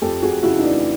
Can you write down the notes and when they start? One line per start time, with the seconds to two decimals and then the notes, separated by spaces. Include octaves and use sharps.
0.02 F2 G4 A4
0.22 F2 F#4 G#4
0.43 C#3 E4 F#4
0.59 D#4
0.64 E3 D4